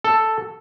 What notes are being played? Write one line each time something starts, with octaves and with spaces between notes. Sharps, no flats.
A4